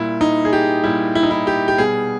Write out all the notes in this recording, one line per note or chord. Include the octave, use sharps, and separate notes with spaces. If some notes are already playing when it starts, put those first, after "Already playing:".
Already playing: A#2 G3 E4
D#4
G#4
G4
A#2 G3 E4
E4
D#4
E4
G4
G4
B2 G3 G#4